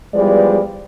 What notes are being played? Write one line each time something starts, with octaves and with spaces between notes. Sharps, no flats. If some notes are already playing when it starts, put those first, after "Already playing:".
E2 F3 G3 G#3 B4 D5